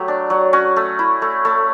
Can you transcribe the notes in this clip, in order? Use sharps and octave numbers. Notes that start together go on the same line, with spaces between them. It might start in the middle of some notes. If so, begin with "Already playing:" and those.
Already playing: F#3 A3 G4
D4
F#3
C#4 F#4
A3
E4
A3
A3